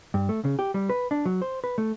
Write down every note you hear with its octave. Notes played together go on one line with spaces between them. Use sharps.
G2
A3
C#3
G4
G3
B4
D4
F#3
C5
B4
A3